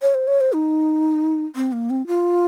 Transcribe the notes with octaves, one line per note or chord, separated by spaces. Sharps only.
C#5
C5
C#5
C5
D#4
C4
A#3
C4
F4